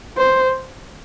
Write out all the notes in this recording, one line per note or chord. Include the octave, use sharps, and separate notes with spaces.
C5